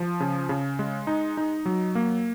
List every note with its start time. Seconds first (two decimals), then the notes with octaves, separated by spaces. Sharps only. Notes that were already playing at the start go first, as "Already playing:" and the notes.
Already playing: F3
0.20 C#3
0.49 C#3
0.79 G#3
1.07 D#4
1.37 D#4
1.66 F#3
1.95 A#3